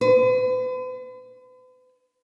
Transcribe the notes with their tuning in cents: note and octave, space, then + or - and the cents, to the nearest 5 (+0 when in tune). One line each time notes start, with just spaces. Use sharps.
B4 +45